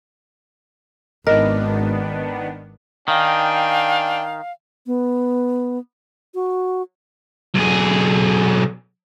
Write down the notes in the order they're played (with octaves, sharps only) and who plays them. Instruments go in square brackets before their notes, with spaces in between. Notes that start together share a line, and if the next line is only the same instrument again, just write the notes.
[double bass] G#1 [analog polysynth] D#3 B3 D4 [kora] A#4 [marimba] D#5
[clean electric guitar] D#3 [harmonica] D4 G5 G#5 [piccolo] F5
[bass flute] B3
F#4
[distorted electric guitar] B1 G#4